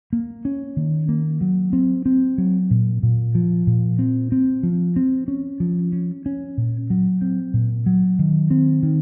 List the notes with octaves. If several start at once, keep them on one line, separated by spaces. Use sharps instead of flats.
A#3
C#4
D#3
A#3
F#3
C4
C4
F#3
A#2
A#2
F3
A#2
C4
C4
F3
C4
C#4
F3
C#4
C#4
A#2
F#3
C4
A#2
F#3
D#3
C4
D#3